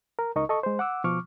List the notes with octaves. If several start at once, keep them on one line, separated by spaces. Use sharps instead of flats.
A#4
C#2 D#4 A#4 D#5 C#6
A4 D#5 C#6
G#3 C5
F#5 D6 E6
B2 F3 C#6 D6 F6